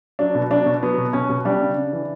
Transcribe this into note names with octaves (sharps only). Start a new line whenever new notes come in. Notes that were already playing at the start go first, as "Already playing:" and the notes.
F#3 D4
B2
F#3 D4
B2
F#3 B3
B2
B2 C#4
B2
G3 D4
C#3
C#3
E3